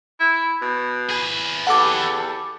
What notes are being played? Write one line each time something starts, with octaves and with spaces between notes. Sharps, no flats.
E4
B2
G#4 B4
E2 G4 A4 F#5 D6